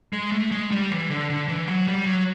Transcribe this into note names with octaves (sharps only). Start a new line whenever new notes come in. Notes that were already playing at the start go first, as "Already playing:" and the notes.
G#3
A3
G#3
G3
E3
D3
D3
E3
F#3
G3
F#3